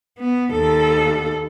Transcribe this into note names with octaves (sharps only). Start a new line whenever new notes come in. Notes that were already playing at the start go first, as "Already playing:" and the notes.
B3
D#2 A4